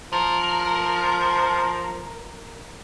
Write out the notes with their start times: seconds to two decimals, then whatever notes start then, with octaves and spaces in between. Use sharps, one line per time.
0.13 F3 A#4